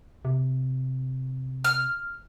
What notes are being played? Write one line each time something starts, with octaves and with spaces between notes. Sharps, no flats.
C3
F6